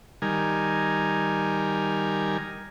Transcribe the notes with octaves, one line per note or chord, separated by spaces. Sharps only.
D#3 G3 A#4 G#5